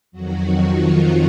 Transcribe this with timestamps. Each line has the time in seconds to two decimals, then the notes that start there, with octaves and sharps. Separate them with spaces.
0.12 F2 D#3 F#3 F#4
0.63 F3 F4